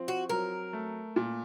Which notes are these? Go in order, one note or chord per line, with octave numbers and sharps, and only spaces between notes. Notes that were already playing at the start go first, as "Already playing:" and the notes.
Already playing: F3 C4
F#4
F#3 A#4
A3
A#2